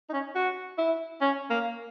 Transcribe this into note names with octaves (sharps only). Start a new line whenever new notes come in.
D#4
C#4
F#4
E4
C#4
A#3